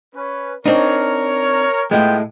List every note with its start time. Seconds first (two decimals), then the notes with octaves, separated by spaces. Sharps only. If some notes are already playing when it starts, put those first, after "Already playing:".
0.15 C#4 B4
0.66 C4 D4 D#4 A#4 C#5
1.91 A2 G#3 B3 F4 G5